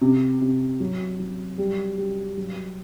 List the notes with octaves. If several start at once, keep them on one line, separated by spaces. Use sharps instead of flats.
C3
C3
F#3
F#3
G3
G3
F#3